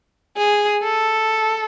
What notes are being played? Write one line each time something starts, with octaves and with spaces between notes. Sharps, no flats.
G#4
A4